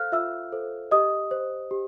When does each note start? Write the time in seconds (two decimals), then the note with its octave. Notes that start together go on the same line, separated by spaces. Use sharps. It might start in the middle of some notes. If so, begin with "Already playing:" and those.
Already playing: A4 C5 F5 F6 F#6
0.12 F4 E5 E6
0.52 A4 C5
0.91 G4 D#5 D#6
1.31 C5
1.71 G4